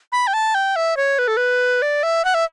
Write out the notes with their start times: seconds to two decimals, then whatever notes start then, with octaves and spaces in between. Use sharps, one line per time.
0.12 B5
0.27 G5
0.33 A5
0.55 G5
0.76 E5
0.97 C#5
1.19 B4
1.28 A4
1.37 B4
1.82 D5
2.03 E5
2.25 F#5
2.34 E5